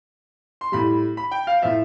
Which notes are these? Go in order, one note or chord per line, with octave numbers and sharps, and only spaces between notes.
C6
A2 G3 B5
B5
G5
F5
A2 F3 E5